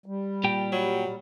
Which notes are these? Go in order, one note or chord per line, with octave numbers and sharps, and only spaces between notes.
G3
A#2 G4 G5
F#3